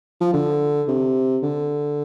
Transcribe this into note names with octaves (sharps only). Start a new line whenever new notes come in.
F3
D3
C3
D3